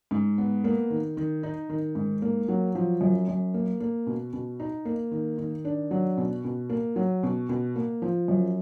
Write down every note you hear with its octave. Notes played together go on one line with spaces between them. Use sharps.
G#2
B3
A#3
D#3
D#3
D#4
D#3
G#2
A#3
F#3
F3
F#2
F#2
A#3
A#3
B2
B2
D#4
A#3
D#3
D#3
D4
F#3
B2
B2
A#3
F#3
B2
B2
A#3
F3
F#2